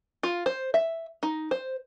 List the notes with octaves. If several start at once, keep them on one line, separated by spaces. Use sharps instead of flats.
F4
C5
E5
D#4
C5